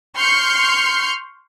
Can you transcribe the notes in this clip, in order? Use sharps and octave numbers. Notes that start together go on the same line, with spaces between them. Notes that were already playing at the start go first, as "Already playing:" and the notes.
C6 C#6 F6 G6 C7 C#7